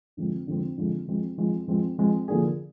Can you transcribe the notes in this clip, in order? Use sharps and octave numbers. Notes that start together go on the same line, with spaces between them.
D3 F3 G#3 C4
D3 F3 G#3 C4
D3 F3 G#3 C4
F3 G#3 C4
F3 G#3 C4
F3 G#3 C4
F3 G#3 C4
D3 F3 A#3 D4 G#4